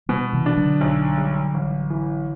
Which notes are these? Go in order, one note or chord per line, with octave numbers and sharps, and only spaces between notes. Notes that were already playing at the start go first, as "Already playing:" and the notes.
B2 G3 B3
C3 E3
D4
D3 F#3
B1
G3
A1
E3